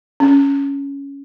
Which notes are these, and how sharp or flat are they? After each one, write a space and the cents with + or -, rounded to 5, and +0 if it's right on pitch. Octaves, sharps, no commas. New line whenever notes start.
C#4 +10